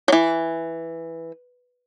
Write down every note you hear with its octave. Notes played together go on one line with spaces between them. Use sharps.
E3 F#3